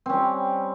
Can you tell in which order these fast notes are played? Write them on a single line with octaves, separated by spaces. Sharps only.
C4 C#4 G3